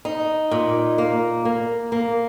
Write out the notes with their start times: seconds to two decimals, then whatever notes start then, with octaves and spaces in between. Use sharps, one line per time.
0.05 D#4
0.51 A#2
0.98 A#3
1.45 A#3
1.92 A#3